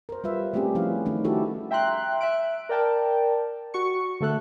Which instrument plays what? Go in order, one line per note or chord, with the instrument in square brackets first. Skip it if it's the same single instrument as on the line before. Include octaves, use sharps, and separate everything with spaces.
[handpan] A#4 C5
G3 F4 B4 E5
G3 A3 C4 C#4 G4 G#4
F3 C#4 E4 G#4 B4 F5
D#3 G3 A3 C#4 D#4
E4 F#4 G4 A4
[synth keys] E5 G5 A#5 C6 F#6
E5 F#6 D7
A#4 D5 G5 A5
F#4 C#6 C#7
D3 A3 A4 F#6